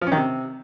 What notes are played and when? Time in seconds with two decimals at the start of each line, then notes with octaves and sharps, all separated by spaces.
0.01 F3
0.07 C#4
0.12 D#3
0.17 C3